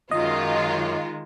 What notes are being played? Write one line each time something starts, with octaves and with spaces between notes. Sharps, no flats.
F#2 D#3 G#3 D#4 F4 D#5